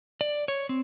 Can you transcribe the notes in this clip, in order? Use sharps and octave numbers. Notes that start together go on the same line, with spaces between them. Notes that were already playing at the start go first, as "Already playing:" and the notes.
D5
C#5
C4